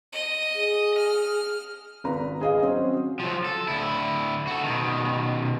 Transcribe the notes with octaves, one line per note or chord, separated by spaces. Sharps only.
D#5
G#4
F6
G#1 B4 A#5
G#4 D#5 F5
F#3 C4 C#4
F3 F#3
A4
D2 E4
F#4 A4
B2 D#3